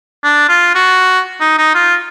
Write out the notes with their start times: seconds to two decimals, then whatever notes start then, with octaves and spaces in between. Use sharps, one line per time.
0.24 D4
0.49 F4
0.75 F#4
1.40 D#4
1.58 D#4
1.74 F4